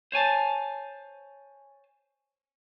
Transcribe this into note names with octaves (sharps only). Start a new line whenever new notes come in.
C5 C#5 G#5 A5